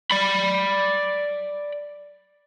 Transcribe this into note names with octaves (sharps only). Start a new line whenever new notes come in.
D5 B5